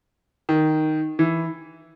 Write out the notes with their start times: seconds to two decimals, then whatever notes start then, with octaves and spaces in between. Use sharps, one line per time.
0.49 D#3
1.19 E3